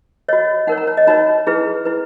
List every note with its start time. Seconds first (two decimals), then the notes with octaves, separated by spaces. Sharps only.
0.29 F#4 C#5 D#5
0.67 D#4 A#4 C#5 F#5
0.78 A#5
0.87 C#5
0.97 D#5
1.07 D#4 F#4 C#5 A#5
1.47 E4 G#4 B4
1.85 E4 B4